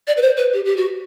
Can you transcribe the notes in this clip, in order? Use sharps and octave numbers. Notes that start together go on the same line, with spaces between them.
D5
B4
C5
B4
G4
G4
F#4